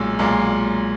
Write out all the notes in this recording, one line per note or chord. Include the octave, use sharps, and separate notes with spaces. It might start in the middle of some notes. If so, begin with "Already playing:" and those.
Already playing: B1 A#2 G#3 E6
B1 A#2 G#3